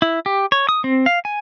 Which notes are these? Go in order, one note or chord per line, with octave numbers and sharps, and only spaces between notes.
E4
G4
C#5
D#6
C4
F5
G#5